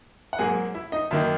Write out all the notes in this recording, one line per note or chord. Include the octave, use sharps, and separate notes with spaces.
F#5
G#2 F#3 A#3 G#4 G#5
E4 E5
D#4 D#5
F#2 D#3 A#3 D#4 E4 E5